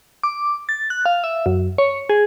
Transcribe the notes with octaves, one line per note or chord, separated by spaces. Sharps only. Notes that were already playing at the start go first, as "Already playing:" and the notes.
D6
A6
F#6
F5
E5
F#2
C#5
G#4